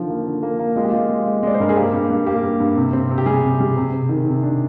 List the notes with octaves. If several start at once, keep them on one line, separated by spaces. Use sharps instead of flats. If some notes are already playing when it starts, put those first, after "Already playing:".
Already playing: D3 D#3 F3
A#3
D3
A#3
A#3
G#3 F4
G4
G#3 F4
G#3
G#3
G#3 D5
C5
G2 A#4
G#4
A#3 G4
G2
G2
A#3 G4
G2
G2
C3
C4
C3
G4
G3 G#4
C3
G3
C3
C3
D#3
C3
D4